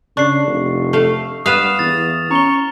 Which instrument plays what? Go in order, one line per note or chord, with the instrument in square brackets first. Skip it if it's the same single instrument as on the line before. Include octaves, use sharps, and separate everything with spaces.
[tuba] C#3 [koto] D4 [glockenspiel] C#6 C7
[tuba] F1
[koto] A3 F5
[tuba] G2 [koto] B3 B4 F5 [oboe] D#6 [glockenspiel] F6 E7 F7
[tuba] E2 [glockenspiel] A6
[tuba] C#4 [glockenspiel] A#5 G7 [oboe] C#6